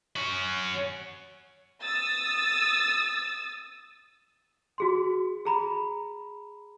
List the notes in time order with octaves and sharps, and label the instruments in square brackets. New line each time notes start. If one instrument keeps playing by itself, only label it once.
[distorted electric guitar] C#4 F#4
[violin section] D#6 E6 A6
[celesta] F#4 G#4 C6
G#4 A#5 B5